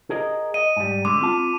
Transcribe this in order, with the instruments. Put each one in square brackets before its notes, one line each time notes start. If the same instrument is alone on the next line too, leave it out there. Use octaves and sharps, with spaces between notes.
[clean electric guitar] G#4 A#4 D#5
[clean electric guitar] D#5 [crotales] D#7
[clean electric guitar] G#2 G3
[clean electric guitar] D3 G#3 [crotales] D6
[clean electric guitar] C4 F4 A5